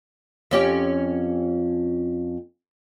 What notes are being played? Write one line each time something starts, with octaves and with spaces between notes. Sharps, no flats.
F2 C#4 G4